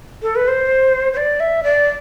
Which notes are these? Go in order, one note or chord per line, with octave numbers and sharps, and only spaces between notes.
A4
B4
C5
C5
D5
E5
D5